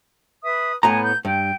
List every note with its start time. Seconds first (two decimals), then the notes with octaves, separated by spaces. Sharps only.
0.43 B4 E5 D#6
0.83 A2 B3 G#5 A#5
1.04 G6
1.25 G2 G5